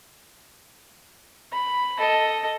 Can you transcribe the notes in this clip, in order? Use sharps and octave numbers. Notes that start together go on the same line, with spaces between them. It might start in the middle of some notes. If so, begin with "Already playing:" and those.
B5
A4 D#5